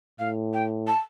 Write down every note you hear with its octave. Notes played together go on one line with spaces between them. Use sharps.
A2 F5
G5
A5